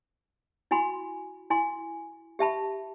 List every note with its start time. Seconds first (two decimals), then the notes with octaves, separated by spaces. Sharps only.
0.71 E4 F#4 G#5 B5 C6
1.50 E4 G#5 C6
2.39 G4 E5 A5 B5